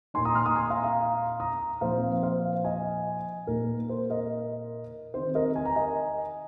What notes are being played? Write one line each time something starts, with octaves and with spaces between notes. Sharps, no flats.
A#2 A#3 D#4 G#5 C6
A#5 D#6
C6 F6
A#5 D#6
G#5 C6
F5 A#5
F5 A#5
A#5 D#6
A#2 F3 C4 D#4 C5 F5
C5 F5
D#5 G#5
A#2 A#3 D#4 A#4
C5
A#4 D#5
D#3 C4 D#4 C5
A#4 D#5
G#5
A#5
D#5 G#5